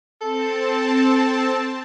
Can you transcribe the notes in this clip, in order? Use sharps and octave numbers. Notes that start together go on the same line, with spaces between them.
C4 A4 A5